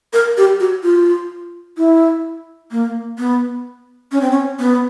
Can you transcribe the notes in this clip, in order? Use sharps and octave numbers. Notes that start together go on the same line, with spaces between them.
A#4
G4
F#4
F4
E4
A#3
B3
C#4
C4
C#4
B3